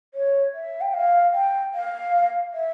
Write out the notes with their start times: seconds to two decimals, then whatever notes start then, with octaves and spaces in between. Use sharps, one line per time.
0.14 C#5
0.54 E5
0.81 G5
0.94 F5
1.33 G5
1.74 F5
2.54 E5